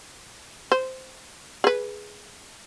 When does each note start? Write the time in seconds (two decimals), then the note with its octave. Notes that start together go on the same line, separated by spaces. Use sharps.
0.72 C5
1.64 G#4 B4